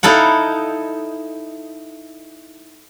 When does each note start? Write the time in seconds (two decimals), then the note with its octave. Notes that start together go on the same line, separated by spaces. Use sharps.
0.03 D#4 E4 A4 F5 F#5